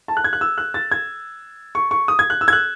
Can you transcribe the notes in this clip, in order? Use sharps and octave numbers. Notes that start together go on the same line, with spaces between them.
A5
F#6
G#6
F#6
E6
F#6
A6
G#6
C#6
C#6
D#6
G#6
F#6
E6
G#6
F#6